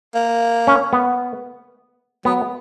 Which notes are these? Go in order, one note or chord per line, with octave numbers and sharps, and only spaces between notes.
A#3
C#4
B3
F#3 B3